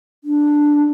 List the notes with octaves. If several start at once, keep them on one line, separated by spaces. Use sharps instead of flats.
D4